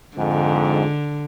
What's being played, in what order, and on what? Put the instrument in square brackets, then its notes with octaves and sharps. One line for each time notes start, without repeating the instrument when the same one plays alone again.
[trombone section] F2 G#2 [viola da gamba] D3